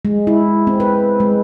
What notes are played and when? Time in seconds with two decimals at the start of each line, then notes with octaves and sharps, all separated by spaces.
0.05 G#3
0.27 E4
0.67 C4
0.80 B4
1.20 G#3